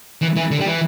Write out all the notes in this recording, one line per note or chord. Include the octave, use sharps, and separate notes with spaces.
E3
E3
D3
G3
E3